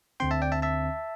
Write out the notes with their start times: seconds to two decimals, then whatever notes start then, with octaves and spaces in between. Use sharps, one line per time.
0.20 D2 D3 C4 G5 C6
0.31 E5 A5
0.42 D5 G5
0.52 E5 A5
0.62 E5 A5